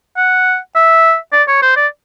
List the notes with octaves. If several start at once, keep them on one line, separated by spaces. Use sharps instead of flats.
F#5
E5
D5
C#5
C5
D5